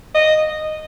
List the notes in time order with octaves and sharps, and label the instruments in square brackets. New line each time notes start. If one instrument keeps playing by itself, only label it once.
[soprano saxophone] D#5